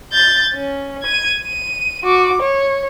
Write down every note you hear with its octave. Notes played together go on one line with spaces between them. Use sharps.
G6 A6
C#4
G#6 D#7
D#7
F#4 D6
C#5